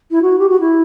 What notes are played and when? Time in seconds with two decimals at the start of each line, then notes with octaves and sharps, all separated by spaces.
0.11 E4
0.22 F#4
0.39 G4
0.49 F#4
0.60 E4